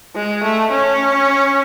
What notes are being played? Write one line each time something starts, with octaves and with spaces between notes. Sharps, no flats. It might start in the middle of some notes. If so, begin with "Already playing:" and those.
G#3
A3
C#4